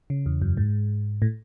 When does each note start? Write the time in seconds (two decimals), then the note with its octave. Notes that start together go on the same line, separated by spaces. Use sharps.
0.10 C#3
0.26 E2
0.42 F#2
0.57 G#2
1.22 A2